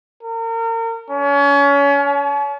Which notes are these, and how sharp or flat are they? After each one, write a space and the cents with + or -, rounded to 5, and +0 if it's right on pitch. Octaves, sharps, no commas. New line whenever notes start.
A#4 -35
C#4 +30
A5 -45